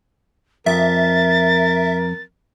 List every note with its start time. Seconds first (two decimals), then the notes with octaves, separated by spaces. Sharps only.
0.66 F2 A#4 E5 A6